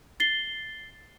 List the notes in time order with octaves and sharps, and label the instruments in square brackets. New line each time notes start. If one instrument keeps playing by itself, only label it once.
[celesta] A6 C7 G7